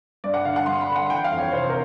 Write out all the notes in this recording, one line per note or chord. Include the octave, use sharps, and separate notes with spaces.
G2 D5
F#5
D3 F5
F#5
G2 C6
B5
D3
F#5
E3 G5
F5
F2
C#5
C3 C5
A#4